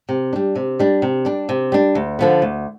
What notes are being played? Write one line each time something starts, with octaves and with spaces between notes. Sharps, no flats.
C3
G3 D4
C3
G3 D4
C3
G3 D4
C3
G3 D4
D2
D3 F3 B3
D2